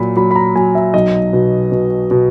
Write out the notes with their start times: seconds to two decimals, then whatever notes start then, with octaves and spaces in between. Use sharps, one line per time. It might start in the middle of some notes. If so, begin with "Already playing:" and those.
Already playing: A#2 F#3 B5
0.16 F#3 B5
0.31 B5
0.36 A#5
0.55 F#3 G#5
0.75 E5
0.94 B1 D#5
1.33 B2
1.72 B2
2.11 B2